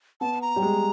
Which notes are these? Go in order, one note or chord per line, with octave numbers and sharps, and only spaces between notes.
B3 A5
A#5
G3
G#3